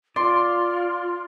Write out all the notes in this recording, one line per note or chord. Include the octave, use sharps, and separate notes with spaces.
F4 D5 C6